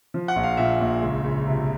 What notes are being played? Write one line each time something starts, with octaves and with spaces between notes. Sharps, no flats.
F3
F#5
A#1
F5
A#2 E5
A#1
C#2
C#2
C3